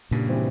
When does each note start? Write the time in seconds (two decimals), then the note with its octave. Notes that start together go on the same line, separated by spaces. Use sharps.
0.11 G2 A#2 C#3
0.29 E3 G3 C4 G4